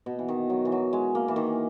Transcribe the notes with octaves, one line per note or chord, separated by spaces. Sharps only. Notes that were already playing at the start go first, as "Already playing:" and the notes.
B2
E3
D#3
F#3
E3
F#3
G#3
A#3
E3
D#3